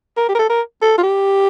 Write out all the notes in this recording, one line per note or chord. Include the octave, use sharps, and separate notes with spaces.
A#4
G4
A#4
A4
A#4
A4
F4
G4